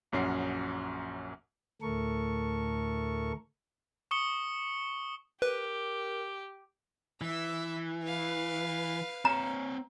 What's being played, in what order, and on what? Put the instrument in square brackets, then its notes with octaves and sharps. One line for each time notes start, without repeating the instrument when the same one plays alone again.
[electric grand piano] A#1 F#2 C#4 F#4 C7
[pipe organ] D2 A2 A3 A4 A#4 C#6
[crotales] C#6 D#6 C#7 G7
[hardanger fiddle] G4 [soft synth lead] A#4 [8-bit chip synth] B4
[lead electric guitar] E3 [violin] E5 E6
[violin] B4 F5
[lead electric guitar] C4 C#5 [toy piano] A#5